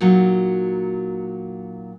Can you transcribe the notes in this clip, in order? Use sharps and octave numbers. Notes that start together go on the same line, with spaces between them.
A#2 F#3 D#4